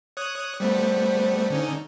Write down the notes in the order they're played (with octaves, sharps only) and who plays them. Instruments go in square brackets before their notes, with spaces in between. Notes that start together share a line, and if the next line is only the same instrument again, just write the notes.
[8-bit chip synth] C#5 D#6 F#6
[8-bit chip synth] G3 A3 B3 [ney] C5
[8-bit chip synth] D3 C#4 D#4